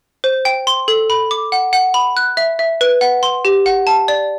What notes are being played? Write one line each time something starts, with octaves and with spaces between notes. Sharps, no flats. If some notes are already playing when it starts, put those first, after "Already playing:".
C5
G5
C6
A4
B5
D6
F#5
F#5
B5
F#6
E5
E5
B4
F#5
C6
G4
F#5
A5
D5